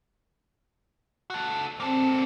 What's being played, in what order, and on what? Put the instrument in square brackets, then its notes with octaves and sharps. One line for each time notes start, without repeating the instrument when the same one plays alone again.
[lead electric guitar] F#4 A4
[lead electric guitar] A#3 A4 [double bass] C4